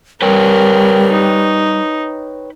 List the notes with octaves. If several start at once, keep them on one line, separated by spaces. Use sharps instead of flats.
G3 A#4 B4 C#5 G5
D#4